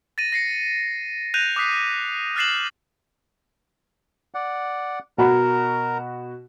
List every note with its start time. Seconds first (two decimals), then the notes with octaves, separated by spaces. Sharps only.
0.18 A6 A#6 D#7
0.32 A#6 C7 C#7
1.34 F#6 G6 A#6 D#7 F7
1.56 D6 D#6 F#6 B6 C7
2.36 F6 F#6 A6 C7 E7 F#7
4.34 D5 F#5
5.18 B2 F#4 A#4 A#5 B5